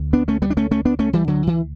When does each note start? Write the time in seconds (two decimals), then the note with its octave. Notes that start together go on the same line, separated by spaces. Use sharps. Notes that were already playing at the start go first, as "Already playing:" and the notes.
Already playing: D2
0.13 B3 D4
0.28 A3 C#4
0.42 G3 B3
0.50 D4
0.57 A3 C#4
0.71 A3 C#4
0.85 B3 D4
0.99 A3 C#4
1.13 E3 G3
1.28 D3 F#3
1.47 E3